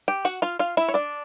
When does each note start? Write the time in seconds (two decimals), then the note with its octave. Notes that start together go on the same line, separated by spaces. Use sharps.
0.08 G4 G5
0.25 F#4 F#5
0.42 F4 F5
0.59 F4 F5
0.77 E4 E5
0.89 C#5
0.94 D4 D5